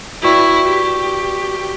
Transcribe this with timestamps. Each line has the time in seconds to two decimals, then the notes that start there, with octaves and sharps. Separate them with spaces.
0.23 E4 F#4 B4 D5 G5 C#6
0.69 G4